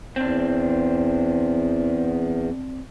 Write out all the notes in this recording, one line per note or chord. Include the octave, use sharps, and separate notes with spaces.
E2 C4 D4